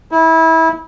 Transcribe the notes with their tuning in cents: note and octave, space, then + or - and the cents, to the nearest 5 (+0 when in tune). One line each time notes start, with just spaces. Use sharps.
E4 -25